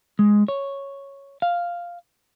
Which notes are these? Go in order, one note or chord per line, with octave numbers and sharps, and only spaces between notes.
G#3
C#5
F5